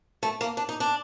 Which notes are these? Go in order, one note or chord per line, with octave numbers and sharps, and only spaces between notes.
A3
A#3
D4
D#4
D4